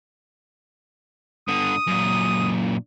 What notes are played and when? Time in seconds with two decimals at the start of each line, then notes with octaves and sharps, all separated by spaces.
1.48 G2 D3 D#6
1.87 F#2 A#2